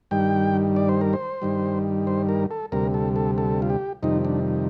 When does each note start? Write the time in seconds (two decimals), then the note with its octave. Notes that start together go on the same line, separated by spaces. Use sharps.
0.11 G2 D#3 G3 G5
0.76 D5
0.89 C5
1.01 A#4
1.13 C5
1.42 G2 D#3 G3
2.07 C5
2.29 A#4
2.51 A4
2.72 D2 C3 G3 A#4
2.94 A4
3.16 A4
3.38 A4
3.62 F4
3.70 G4
4.03 F2 C3 D#3 G3 D#4
4.25 D4